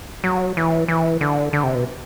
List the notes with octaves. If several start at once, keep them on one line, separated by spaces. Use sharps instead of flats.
F#3
E3
E3
D3
D3
C3
B2